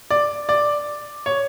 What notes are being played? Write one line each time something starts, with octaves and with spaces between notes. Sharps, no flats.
D5
D5
C#5